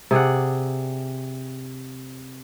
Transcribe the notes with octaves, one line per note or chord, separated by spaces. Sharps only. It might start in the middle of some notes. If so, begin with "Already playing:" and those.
C3 G#4 D5 F#5